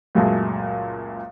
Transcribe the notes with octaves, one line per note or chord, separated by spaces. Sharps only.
C#2 F#2 A#2 F#3 G#3 A3